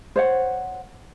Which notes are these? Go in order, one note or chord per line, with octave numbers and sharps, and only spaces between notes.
C5 C#5 F#5